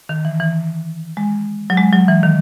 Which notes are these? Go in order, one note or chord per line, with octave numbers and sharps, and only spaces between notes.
D#3
E3
E3
G#3
F#3
G#3
F#3
E3
D#3